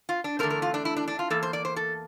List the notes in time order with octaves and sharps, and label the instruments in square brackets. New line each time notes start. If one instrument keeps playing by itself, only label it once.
[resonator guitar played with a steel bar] F4
D4
E2 D3 A3 C4 A#4
A#4
F4
D4
E4
D4
D4
F4
E2 E3 A#3 A4
C5
D5
C5
A4